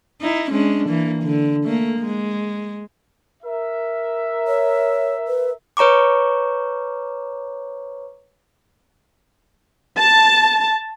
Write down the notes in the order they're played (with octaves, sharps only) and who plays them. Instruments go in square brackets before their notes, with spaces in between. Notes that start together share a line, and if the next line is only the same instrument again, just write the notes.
[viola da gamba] D#4 E4
G#3 C#4 D4
E3 A#3
D3
A3 A#3
G#3
[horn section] A#4 E5
[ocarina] C#5
B4
[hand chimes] B4 C#5 A#5 C#6 D6
[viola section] A5